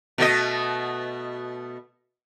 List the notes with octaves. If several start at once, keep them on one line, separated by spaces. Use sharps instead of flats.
B2 A3 D#5